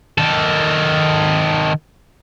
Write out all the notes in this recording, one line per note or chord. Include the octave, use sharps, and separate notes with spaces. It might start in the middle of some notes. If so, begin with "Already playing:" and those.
D#3 A4